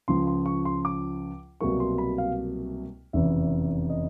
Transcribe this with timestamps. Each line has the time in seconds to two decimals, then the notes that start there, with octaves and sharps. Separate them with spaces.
0.08 C#2 C#3 F3 C6
0.27 C6
0.46 C#6
0.65 C6
0.85 D6
1.61 C2 B2 F#3 A#3 C#6
1.80 C6
1.98 B5
2.18 F5
3.13 F1 E2 C#3 E3 E5
3.90 D#5